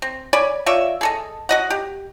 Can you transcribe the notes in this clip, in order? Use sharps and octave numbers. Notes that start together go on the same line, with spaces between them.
C4
C#5 D5 G#5 B5
F4 C#5 D5 E5
G#4 A4 D#5
F#4 D#5 F#5
G4